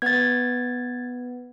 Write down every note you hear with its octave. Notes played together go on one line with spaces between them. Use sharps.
B3 B4 F#5 G#6 A6